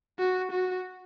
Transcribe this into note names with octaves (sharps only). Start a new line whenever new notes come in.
F#4
F#4